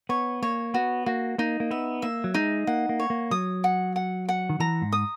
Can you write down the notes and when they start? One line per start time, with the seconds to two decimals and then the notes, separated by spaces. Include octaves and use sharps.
0.09 B3 C#5
0.43 A#3 C#5
0.74 B3 F#4
1.06 A#3 F#4
1.38 A#3 D#4
1.60 A#3
1.71 B3 E5
2.02 A#3 E5
2.24 F#3
2.34 G#3 D#4
2.67 A#3 F#5
2.89 A#3
3.00 C#5
3.10 A#3
3.31 F#3 D#6
3.64 F#5
3.96 F#5
4.29 F#5
4.50 D#3
4.60 E3 A#5
4.82 G#2
4.92 D#6